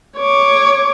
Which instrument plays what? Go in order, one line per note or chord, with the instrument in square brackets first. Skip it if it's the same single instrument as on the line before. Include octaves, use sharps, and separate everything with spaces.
[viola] C#5 D6